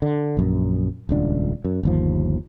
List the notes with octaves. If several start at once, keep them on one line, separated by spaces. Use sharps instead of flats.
D3
A#1 F#2
D#1 C#2 D4
F#2
G1 D#2 F3